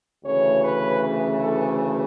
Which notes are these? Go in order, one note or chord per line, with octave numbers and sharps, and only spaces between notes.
D2 C#3 E3 A3 C#5
B4
A4